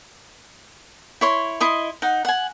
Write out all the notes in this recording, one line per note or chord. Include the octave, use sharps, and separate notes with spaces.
E4 C#5 C6
E4 D#5 C6
D#4 F#5
F#5 G#5